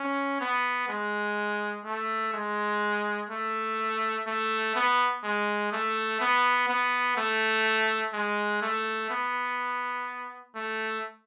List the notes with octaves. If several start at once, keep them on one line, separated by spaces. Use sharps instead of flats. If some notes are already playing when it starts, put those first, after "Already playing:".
Already playing: C#4
B3
G#3
A3
G#3
A3
A3
B3
G#3
A3
B3
B3
A3
G#3
A3
B3
A3